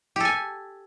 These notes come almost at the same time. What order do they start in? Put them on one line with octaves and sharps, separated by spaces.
G4 A4 G#5